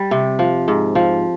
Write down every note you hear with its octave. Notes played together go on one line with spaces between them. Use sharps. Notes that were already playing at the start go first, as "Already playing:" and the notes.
Already playing: G3
C3
F3
G#2
F3